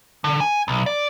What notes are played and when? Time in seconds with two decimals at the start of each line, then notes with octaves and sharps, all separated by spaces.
0.24 D3
0.40 G#5
0.68 B1
0.86 D5